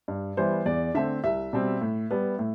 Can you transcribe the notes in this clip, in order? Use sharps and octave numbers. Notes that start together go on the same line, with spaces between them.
G2
E3 G3 B3 C5
E2 D5
D3 A3 C4 E5
C2 E5
B2 G3 C4
A2
G3 B3
A2